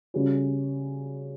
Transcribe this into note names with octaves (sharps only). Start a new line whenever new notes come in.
C#3 G3 C#4 F#4